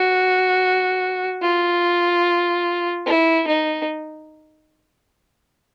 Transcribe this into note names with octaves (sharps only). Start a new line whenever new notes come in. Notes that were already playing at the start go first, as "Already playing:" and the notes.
Already playing: F#4
F4
E4
D#4